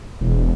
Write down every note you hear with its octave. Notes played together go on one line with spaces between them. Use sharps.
E1